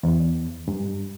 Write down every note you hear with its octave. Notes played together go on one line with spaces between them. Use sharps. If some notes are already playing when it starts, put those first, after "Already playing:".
E2
G2